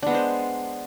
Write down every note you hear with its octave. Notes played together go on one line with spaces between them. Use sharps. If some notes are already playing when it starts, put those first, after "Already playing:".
G#3 B3 D4 C5